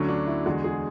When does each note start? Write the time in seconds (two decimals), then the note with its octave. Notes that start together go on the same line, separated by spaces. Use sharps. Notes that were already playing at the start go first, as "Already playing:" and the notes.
Already playing: D2 D3 F#3 A3 C#4
0.09 D4
0.27 E4
0.46 E2 D3 G#3 F#4
0.64 G#4